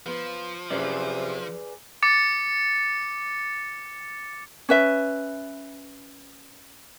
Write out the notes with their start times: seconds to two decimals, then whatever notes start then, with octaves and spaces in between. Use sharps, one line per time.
0.06 F3 B3
0.70 F#2 C3 G#4 B4 D5
2.03 D6 A6 C#7
4.69 C#4 B4 E5